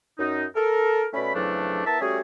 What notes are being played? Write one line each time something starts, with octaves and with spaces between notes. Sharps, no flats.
F#2 D#4
A4 A#4
B2 A3 C#4 D5 B5
F2 C#3 E3 F#3 A3 D4
B3 E4 A#4 E5 A5
G3 A3 C#4 F#4 G#4